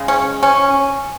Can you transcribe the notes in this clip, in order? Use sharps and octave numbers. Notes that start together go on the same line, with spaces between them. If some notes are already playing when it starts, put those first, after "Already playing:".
Already playing: C#3 G#3
C#4
C#4